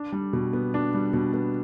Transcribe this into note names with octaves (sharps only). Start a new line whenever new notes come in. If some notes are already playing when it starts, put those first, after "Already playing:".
Already playing: D4
G3
B2
B3
D4
G3
B2
B3